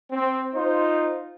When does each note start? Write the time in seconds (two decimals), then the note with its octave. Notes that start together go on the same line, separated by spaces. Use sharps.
0.11 C4
0.54 D#4 F4 C5